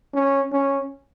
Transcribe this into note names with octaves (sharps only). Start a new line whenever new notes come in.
C#4
C#4